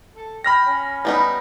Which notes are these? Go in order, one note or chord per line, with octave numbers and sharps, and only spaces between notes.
A4
G5 B5 F6 A#6
C#4
G3 B3 D#4